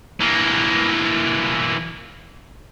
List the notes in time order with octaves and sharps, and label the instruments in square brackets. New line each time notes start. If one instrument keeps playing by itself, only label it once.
[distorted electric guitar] E3 A#3